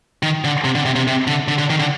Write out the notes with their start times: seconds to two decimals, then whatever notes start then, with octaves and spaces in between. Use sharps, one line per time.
0.23 D#3
0.44 D3
0.64 C3
0.75 D3
0.85 C3
0.96 C3
1.07 C3
1.27 D3
1.48 D3
1.58 D3
1.70 D#3
1.79 D3